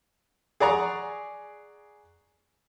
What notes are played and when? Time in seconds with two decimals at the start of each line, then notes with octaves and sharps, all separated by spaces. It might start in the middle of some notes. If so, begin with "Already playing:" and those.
0.60 G#4 D5 F#5 A#5 C#6 D#6